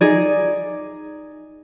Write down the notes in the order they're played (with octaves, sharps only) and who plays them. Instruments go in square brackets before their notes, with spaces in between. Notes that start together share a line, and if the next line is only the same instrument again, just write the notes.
[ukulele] D#4 G#4 D5